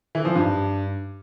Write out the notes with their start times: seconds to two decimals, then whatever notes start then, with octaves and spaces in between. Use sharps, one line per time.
0.15 E3
0.25 F3
0.35 G2